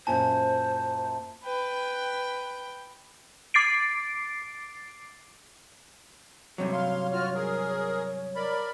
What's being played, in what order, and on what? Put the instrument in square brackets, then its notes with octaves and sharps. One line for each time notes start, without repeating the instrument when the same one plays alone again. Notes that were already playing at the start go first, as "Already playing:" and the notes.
[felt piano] F#2 A#2 G#5 [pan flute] C5 [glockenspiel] A5
[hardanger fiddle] B4 G5
[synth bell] D6 A6 C7 D7
[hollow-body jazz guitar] G2 C3 F#3 [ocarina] C#5
[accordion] F5 C6
F4 F#4 F6
G#4 A#4
A#4 D5 B5